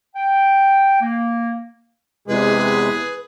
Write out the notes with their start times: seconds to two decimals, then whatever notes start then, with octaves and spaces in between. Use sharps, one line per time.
0.16 G5
1.01 A#3
2.28 E2 C3 G#3 G#4 B4